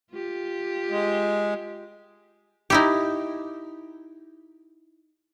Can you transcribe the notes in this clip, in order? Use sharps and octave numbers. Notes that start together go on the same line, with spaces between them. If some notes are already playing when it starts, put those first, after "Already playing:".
F4 G4
G#3
D#4 E4 G4